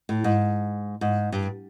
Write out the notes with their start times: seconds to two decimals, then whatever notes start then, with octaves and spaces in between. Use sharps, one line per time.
0.09 A2
0.24 G#2
1.01 G#2
1.32 G2